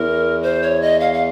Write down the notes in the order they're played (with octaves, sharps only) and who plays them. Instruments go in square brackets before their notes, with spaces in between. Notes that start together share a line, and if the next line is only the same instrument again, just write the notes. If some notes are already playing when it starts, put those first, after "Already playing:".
Already playing: [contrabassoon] E2 [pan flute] A#4
[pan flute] C5
C#5
D#5
F5
F5